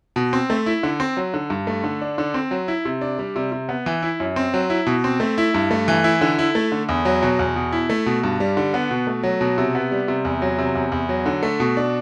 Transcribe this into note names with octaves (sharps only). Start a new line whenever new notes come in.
B2
C4
A3
E4
D3
C4
F#3
D3
G2
A3
D3
D4
D3
C4
F#3
E4
C3
D4
G3
C3
C3
B3
E3
E4
F#2
C4
F#3
E4
B2
C4
A3
E4
G2
A3
E3
E4
D3
E4
A3
D3
E2
F#3
B2
E2
B2
E4
A3
B2
G2
G3
D3
B3
B2
A3
F#3
B2
C3
B3
G3
C3
E2
F#3
C3
E2
E2
F#3
D3
A3
B2
D4